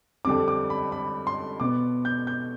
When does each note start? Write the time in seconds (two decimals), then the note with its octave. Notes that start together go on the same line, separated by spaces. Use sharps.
0.25 F2 D3 G3 C4 D6
0.48 D6
0.70 B5
0.92 B5
1.27 C6
1.60 B2 B3 D6
2.05 G6
2.27 G6